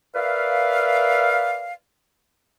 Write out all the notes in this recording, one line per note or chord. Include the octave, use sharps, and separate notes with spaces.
A#4 B4 D5 E5 F5